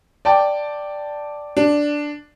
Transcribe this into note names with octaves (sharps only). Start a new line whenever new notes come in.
D5 G5 A5
D4